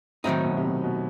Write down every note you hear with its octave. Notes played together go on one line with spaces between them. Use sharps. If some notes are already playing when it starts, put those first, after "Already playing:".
A2 D#3 F#3 C4 D#4
B2
C3
B2
B2